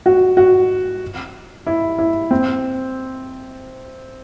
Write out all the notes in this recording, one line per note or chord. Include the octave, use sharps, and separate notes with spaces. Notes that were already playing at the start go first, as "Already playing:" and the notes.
F#4
F#4
E4
E4
C4